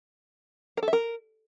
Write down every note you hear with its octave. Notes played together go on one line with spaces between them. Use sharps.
A#4
A4
E5
A#4